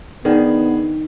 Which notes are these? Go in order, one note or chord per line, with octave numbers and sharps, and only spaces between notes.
D#3 B3 D4 G#4